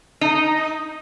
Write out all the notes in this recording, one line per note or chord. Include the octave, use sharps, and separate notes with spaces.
D#4